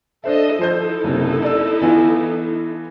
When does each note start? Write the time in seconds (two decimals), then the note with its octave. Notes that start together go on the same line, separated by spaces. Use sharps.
0.24 D4 A4 C5 D#5 E5
0.59 F3 D#4 E4 A4 C5 G6
1.04 F#1 C3
1.42 D5 E6
1.81 E3 B3 F4